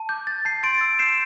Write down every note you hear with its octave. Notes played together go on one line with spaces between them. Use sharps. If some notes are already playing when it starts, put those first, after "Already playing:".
Already playing: A5
D6 G6
G6 A6
A5 G6 C7
C6 A6 D7
E6
G6 C7 E7